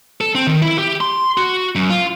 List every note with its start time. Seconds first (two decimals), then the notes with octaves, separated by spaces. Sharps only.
0.21 A4
0.35 C4
0.47 D#3
0.62 E4
0.78 G4
1.01 C6
1.37 F#4
1.75 F#2
1.90 F4